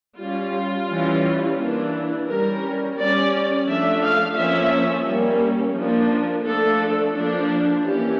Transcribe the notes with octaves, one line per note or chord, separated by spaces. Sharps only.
G3 C#4 F4
E3 G3 C#4
E3 A#3 D4
G3 C#4 A#4
G3 C#4 D5
F3 A3 D4 E5
F5
F3 A#3 C#4 E5
G3 A#3 C#4
F3 A#3 D4
F3 A3 D4 A4
F3 A#3 D4
E3 A#3 C#4 G4